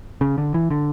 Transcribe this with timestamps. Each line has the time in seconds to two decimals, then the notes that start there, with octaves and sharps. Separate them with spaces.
0.21 C#3
0.38 D3
0.54 E3
0.70 D3